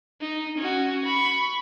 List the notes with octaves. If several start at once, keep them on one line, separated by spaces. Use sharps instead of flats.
D#4
C#4 F#4
B5 C#6